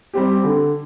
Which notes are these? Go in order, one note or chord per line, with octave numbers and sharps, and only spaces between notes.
G3 C4 G4
D3